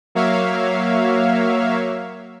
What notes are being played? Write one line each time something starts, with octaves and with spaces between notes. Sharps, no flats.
F#3 A#3 C#5 E5 F5